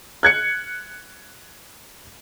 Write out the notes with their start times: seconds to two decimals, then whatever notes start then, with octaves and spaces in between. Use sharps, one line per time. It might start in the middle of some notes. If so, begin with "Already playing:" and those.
0.23 F#6 G#6 C#7